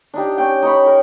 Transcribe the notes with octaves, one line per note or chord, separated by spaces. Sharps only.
D4 D#4 G4
C#4 G5
D#4 C#5 B5
A#4